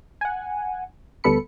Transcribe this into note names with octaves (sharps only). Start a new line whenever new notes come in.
F#5 G#5
D2 G3 B3 A4 B5 C#7